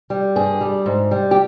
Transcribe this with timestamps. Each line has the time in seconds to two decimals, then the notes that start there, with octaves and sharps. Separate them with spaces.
0.10 G3
0.36 G2 G#4
0.61 G3
0.86 G#2
1.11 G3
1.31 G4